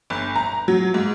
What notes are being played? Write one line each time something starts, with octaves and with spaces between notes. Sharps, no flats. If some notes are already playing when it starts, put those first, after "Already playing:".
G1
A#5
F#3
G#2